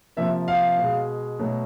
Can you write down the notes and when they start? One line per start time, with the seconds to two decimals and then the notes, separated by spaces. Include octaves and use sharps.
0.17 C3 F3 A#3 E5
0.48 F5
0.78 B2
0.83 G#3
1.39 B2 F#3 A3